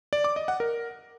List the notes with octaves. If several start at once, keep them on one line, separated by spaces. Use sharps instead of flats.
D5
D6
D#5
F#5
A#4